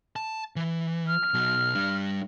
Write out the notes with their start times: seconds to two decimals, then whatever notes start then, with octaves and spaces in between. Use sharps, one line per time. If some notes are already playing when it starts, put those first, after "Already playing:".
0.16 A5
0.56 E3
1.08 F6
1.34 B2 F#3
1.75 G3 D4